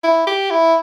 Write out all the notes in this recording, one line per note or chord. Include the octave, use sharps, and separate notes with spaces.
E4
G4
E4